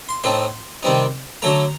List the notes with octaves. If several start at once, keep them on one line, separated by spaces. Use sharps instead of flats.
C6
A2 A3 C4 D#4 C6
C3 D#3 G3 C4 D#4
D3 F#3 A3 A#5